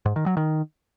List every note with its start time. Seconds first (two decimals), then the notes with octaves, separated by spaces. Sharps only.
0.06 G#2
0.16 D#3
0.26 F#3
0.37 D#3